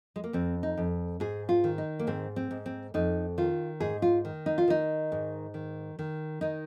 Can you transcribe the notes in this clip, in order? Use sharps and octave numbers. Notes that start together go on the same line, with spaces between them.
G#3
A#3
F2 C4
D#4
F2
G#2 G#4
F4
D#3
D#4
A#3
G#2 C4
C4
G#2
C4
F2 D#4
D#3 F4
G#2 G#4
F4
D#3
D#4
F4
D#3 D#4
G#2
D#3
D#3
D#3 D#4